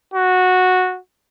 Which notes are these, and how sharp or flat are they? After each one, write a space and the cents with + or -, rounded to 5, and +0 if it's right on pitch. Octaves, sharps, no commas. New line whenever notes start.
F#4 -10